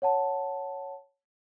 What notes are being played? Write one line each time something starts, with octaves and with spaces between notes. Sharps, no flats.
C#5 F#5 A5